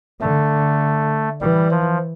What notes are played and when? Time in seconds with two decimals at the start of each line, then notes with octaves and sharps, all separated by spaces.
0.21 D3 A3
1.41 E3 G3
1.71 F3